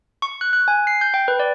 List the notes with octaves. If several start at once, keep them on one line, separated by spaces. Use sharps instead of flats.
C#6
F#6
F#6
G#5
C7
G6
G5
B4
D5